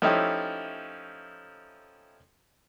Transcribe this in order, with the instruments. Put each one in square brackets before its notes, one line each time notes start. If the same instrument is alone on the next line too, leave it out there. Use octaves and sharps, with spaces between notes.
[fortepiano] F3 A3 C#4 D#4 E4 G4